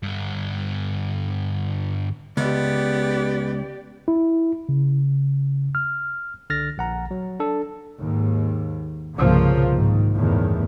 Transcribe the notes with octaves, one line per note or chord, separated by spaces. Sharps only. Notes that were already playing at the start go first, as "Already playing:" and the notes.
G2 D3
C#2 B3 G4 D5
E4
C#3
F6
C2 D3 F6 A6 A#6
A#1 F#5 A#5
F#3
D4 A4
D#2 G#2
C2 G2 A#2 C#3 F3 A#3
G#2 D#3
G1 E2 A2 D#3